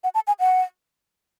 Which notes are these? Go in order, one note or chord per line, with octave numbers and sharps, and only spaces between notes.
F#5
A5
G#5
F#5